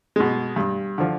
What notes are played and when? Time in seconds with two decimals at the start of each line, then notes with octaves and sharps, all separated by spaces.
0.16 B2 G#3
0.56 G2
0.98 D3 F3